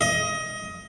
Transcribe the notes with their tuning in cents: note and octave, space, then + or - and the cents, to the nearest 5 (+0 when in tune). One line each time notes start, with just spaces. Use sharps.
D#5 +20